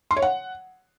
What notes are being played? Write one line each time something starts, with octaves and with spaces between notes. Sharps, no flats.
C6
C#5
F#5